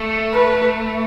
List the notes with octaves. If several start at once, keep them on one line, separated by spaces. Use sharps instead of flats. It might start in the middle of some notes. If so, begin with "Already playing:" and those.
Already playing: A3
B4